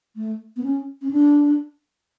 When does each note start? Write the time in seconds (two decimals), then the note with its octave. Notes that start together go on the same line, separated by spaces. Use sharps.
0.16 A3
0.56 B3
0.63 C#4
1.02 C#4
1.11 D4